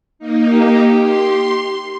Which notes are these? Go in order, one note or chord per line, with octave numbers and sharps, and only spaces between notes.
A#3 D#4
G4
C6